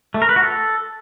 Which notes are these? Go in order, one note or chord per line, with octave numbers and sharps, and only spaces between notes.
A3
A#4
B4
F#4
A4